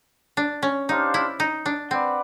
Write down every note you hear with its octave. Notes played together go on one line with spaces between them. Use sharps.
D4
C#4
D4 D#4 G4 C5 F5
E4
D#4
D4
C4 B4 D5 F#5